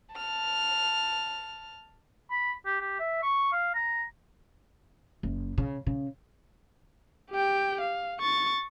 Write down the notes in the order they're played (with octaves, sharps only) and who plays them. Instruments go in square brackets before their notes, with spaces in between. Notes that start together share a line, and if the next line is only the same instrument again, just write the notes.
[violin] A5 F6
[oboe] B5
G4
G4
E5
C#6
F5
A#5
[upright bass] F#1
C#3
C#3
[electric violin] G4 G5
F5
C#6 A6